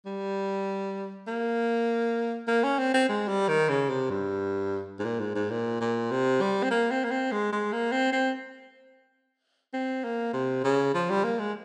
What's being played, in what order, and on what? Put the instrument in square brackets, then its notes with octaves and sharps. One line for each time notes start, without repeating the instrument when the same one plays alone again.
[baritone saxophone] G3
A#3
A#3
C#4
C4
C4
G#3
G3
D#3
C#3
C3
G2
G#2
A#2
G#2
G#2
A#2
A#2
C3
G3
C4
A#3
C4
A#3
C4
G#3
G#3
A#3
C4
C4
C4
A#3
C3
C#3
F3
G3
A#3
G#3